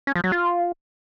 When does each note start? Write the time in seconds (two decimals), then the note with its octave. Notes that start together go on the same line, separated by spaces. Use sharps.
0.07 C#4
0.15 F3
0.24 F#3
0.32 F4